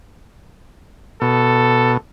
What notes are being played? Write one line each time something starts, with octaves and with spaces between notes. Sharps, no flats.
B2 A4